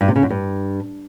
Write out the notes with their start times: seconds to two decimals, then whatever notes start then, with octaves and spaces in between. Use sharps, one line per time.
0.01 G2
0.08 C3
0.16 C#3
0.23 F#2
0.30 G2